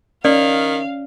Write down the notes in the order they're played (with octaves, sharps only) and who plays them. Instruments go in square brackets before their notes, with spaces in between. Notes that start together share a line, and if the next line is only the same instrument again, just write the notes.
[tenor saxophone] D#3 [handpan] C#4 [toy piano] D5 [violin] F5